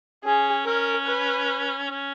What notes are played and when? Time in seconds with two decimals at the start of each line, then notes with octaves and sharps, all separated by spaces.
0.24 C#4 G#4
0.66 C#4 A#4
1.07 B4
1.90 C#4